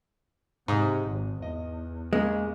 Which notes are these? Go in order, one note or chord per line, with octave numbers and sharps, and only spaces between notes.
G#2 C3 D#5 D#6
G#1
E2 D#5
A#2 C#3 G#3 A#3